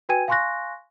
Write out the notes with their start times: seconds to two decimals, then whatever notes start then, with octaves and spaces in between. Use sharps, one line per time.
0.09 F#4 B4 G5 G#5 G#6 D#7
0.28 F5 G#5 C6 C#6 F#6 A#6